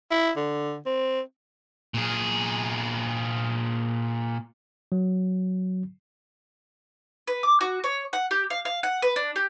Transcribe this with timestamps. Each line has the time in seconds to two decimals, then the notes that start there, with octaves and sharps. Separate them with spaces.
0.11 E4
0.37 D3
0.86 C4
1.94 A#2 G#4
4.92 F#3
7.27 B4
7.43 D6
7.61 F#4
7.84 C#5
8.13 F#5
8.31 G4
8.50 F5
8.65 F5
8.83 F#5
9.02 B4
9.16 D4
9.36 G4